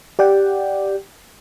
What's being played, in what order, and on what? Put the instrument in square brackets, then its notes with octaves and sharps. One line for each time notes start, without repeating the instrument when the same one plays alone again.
[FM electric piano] G4 D5 F#5 G5